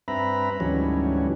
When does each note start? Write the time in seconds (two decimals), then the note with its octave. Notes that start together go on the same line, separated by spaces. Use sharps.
0.08 G2 C4 B4 E5 A#5 B5
0.60 D2 G#2 E3 F#3 G3 C#4